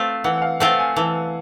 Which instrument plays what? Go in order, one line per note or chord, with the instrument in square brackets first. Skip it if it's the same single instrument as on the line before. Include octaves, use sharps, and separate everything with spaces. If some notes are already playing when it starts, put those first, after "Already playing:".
Already playing: [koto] A3 C4 F4
[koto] E3 [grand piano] F#5
[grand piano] F#5
F5
[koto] A3 C4 F4 [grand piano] F#5
[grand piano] G#5
[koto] E3 [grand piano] A5